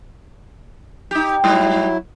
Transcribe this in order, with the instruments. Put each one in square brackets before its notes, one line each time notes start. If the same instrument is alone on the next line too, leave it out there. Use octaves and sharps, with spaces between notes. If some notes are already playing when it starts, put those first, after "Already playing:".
[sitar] D#4 G4
[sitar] G#2 G3 [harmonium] F#3 E4